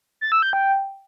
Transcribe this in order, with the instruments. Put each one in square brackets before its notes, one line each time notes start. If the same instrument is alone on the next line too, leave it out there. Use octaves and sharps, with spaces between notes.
[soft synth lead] A6
E6
G6
G5